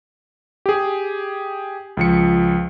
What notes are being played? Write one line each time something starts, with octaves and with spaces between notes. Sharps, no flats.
G4 G#4
C#2 F3 C#7